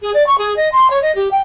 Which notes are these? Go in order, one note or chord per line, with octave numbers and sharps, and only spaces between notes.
G#4
D5
C#6
G#4
D#5
C6
C#5
D#5
G4
G5